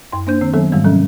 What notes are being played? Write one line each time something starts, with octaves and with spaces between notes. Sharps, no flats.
F#2 C6
A#3 D4 C5 G6
D#3 C4
D#3 F#3 B3 A4
G#2 D#3 E3 G3 G#3
C3 F3 F#3 C#4 A4